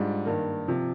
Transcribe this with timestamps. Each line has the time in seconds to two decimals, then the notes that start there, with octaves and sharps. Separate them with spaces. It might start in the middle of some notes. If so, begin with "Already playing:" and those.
Already playing: G#2 G3 D4 F4
0.25 G2 D#3 A#3
0.68 C3 F3